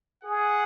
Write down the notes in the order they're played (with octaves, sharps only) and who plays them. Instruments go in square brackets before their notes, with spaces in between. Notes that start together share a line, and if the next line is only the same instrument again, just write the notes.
[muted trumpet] G#4 [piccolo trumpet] F#5